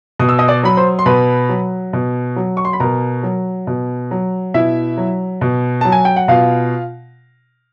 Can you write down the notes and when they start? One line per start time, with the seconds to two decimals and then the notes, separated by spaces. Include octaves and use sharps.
0.19 B2 D#6
0.29 E6
0.39 D#5 D#6
0.48 D5 D6
0.63 F#3 B5
0.77 C5 C6
0.99 C6
1.06 B2 B4 B5
1.49 F#3
1.93 B2
2.36 F#3
2.57 C#6
2.65 C6
2.73 B5
2.80 B2 A#4 A#5
3.23 F#3
3.67 B2
4.11 F#3
4.54 B2 E4 E5
4.98 F#3
5.41 B2
5.81 F#3 A5
5.92 G#5
6.05 G5
6.16 F#5
6.28 B2 F4 F5